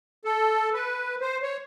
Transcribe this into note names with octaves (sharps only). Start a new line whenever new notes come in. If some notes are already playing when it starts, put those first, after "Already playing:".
A4
B4
C5
C#5